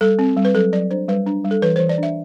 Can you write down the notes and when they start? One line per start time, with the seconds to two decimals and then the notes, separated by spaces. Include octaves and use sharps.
0.01 G3 A4
0.19 C4
0.37 G3
0.45 B4
0.55 F#3 A4
0.73 F#3 D5
0.91 D4 C5
1.08 G3 B4
1.27 D4
1.44 G3
1.51 A4
1.62 E3 B4
1.76 E3 C5
1.89 D5
1.98 D4 E5